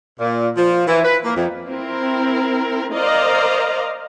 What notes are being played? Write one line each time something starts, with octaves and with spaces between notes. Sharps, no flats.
A#2
F3
E3
B4
A#3
F2
C4 E4 A#4
A#4 C5 D5 D#5 F5 A#5